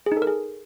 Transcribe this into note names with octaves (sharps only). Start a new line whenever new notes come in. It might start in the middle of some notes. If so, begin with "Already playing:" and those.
G#4
D#4
A4
A#4
G#4